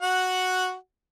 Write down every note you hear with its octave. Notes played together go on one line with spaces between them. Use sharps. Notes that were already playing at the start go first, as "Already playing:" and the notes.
F#4 F#5